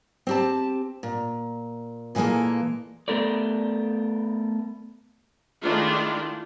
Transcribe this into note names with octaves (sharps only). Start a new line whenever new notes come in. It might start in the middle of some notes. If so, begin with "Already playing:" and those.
C4 G4 A5
A#2
A#2 E3 G#3 A#3 A4
A3 B3 A4 A#4 D5
D#3 G#3 A3 D4 E4 F4